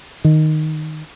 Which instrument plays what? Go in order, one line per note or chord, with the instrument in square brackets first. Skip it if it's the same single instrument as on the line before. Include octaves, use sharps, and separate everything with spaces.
[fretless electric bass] D#3